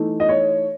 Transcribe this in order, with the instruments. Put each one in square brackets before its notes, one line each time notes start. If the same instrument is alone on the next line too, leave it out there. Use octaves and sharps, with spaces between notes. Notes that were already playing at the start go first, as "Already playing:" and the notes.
Already playing: [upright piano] E3 A3 D#4
D#5
C#5